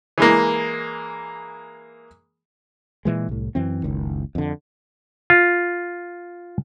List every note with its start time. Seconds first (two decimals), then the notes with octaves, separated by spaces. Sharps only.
0.18 E3 G#3 A#3
3.05 A#2 E3 G#3
3.29 C2 A2
3.55 F#2 E3 C4
3.83 F#1 C#2 D#3
4.35 F2 D3
5.30 F4